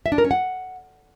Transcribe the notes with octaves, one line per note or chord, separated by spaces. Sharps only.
E5
D4
A#4
C#4
F#5